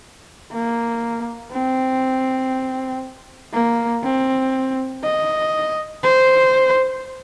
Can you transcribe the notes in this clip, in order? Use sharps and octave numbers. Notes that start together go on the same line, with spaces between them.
A#3
C4
A#3
C4
D#5
C5